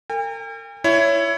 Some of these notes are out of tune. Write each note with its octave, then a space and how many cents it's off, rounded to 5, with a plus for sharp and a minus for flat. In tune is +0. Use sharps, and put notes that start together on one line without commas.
A#4 -45 G5 +45
E4 +15 C#5 +15